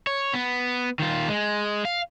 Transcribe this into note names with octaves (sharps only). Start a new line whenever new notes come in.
C#5
B3
D#3 F4
G#3
F5